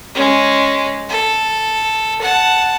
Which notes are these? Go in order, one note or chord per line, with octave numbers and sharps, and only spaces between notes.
G#3 C#4
A4
F#5 A5